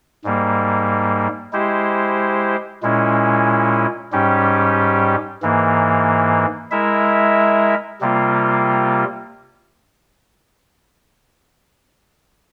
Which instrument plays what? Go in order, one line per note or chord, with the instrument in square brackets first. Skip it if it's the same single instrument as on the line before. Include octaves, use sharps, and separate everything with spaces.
[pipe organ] G#2 G3 A#3
G#3 E4 G4 C5
A#2 G#3 C#4 E4
G#2 G3 C#4 G4
G#2 E3 A#3
G#3 E4 A#4 E5
C3 G3 A#3 F4